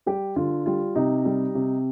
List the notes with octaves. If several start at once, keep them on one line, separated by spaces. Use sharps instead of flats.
G3 G4
D3 F4
G3 F4
C3 D#4
G3
C3